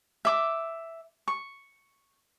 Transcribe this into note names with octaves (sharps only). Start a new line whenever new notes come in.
E5 D6
C#6